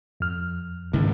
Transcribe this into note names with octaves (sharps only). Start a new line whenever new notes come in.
F2 F6
C#2 G#2 D#3 E3